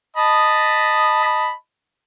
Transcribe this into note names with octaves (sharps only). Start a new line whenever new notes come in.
D#5 A5 B5